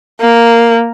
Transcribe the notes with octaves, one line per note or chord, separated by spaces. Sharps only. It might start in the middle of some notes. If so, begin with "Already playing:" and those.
A#3